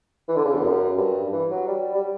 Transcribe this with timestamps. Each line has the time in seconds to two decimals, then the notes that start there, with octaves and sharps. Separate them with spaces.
0.28 E3
0.37 D3
0.45 C#3
0.55 E2
0.63 F#2
0.97 G2
1.33 E3
1.51 F#3
1.68 G3
1.94 G3